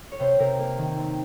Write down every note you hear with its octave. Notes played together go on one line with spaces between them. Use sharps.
C#5
C3 C5
C3 A#4
A#3
D#3
C4